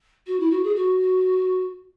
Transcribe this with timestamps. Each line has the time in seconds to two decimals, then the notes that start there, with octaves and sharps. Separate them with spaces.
0.27 F#4
0.40 E4
0.51 F#4
0.64 G#4
0.75 F#4